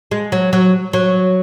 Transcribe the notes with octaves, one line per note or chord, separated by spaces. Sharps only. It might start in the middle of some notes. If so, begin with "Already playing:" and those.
G#3
F#3
F#3
F#3